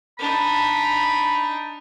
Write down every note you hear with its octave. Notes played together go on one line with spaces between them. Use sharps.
D4 D#4 B5